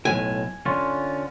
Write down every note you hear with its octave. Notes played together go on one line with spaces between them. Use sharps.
B1 A2 G#5
D3 C#4 F4